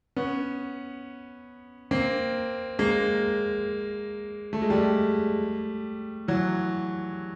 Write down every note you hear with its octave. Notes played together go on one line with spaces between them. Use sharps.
B3 C#4
A#3 C4
G#3 A#3
A3
G#3
G3 A3
E3 F#3